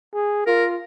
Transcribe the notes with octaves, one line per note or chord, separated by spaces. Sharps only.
G#4
F4 A#4